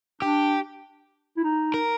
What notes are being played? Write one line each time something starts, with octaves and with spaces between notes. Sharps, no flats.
D4 G4
E4
D#4
A#4